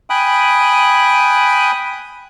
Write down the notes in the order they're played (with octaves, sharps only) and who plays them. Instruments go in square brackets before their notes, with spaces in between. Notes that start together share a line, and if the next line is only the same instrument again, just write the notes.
[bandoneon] G5 G#5 B5 D#6 F#6